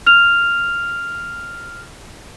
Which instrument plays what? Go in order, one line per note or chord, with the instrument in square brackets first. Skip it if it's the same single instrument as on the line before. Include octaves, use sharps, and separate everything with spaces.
[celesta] F6 F7